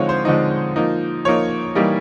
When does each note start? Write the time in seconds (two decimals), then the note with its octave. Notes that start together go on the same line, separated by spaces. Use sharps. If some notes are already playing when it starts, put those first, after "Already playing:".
Already playing: D3 F3 G#3 C4 D#4 C#5 F5
0.09 C5
0.25 D3 F3 G#3 C4 D#4
0.76 F3 A#3 D#4
1.25 F3 A#3 D#4 C#5
1.75 E3 G3 A#3 D#4